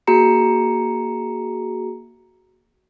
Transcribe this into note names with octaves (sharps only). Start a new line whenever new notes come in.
A#3 F#4 G#4 A#5 C#7